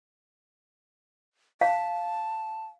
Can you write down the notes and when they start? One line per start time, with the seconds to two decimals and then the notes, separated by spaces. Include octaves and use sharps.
1.61 F5 A5